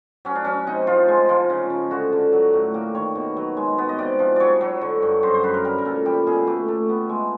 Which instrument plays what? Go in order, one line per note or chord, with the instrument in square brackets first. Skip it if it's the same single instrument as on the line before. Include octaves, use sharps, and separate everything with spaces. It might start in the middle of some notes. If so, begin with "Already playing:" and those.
[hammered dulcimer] F#3 C#4
D4
F#3 C#4
C3 D#4
F3 F4
G#3
F3
C#3
C#3
D3 F#4
D3
F#3
A2
A#3 G4
D#3 C#5
B2
F#3
G#3
B3
D#5
C3 D5
F3
F#3 C#5 D5
F#3
D3
G2
F#2 C5
C5
F#2 B4
A#4
G3 A#4
A#4
A#2 A4
G3 G4
B2 G#4
A3 G4
A3
B3
G#3